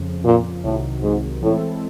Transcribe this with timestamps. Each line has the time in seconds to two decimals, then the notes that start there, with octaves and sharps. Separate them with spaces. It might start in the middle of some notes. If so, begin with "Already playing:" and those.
Already playing: F2 C#3 F3
0.24 A#2
0.63 C2 A2 C3 D#3 F#3
1.03 G#2
1.41 A2 E3 G#3 C4 E4 A4